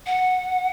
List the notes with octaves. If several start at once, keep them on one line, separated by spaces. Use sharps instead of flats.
F#5